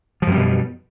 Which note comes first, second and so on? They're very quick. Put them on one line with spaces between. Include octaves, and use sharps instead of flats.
F3 F#2 G3 B2